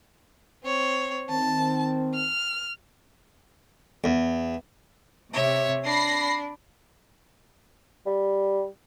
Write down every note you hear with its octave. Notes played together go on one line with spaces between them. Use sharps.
C4 C#5
D#3 C4 A5
F6
E2
C3 C#5 E5
D4 B5 A#6 C7
G3